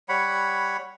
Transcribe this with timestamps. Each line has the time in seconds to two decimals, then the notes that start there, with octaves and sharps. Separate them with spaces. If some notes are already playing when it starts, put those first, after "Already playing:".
0.09 G3 C#5 F#5 B5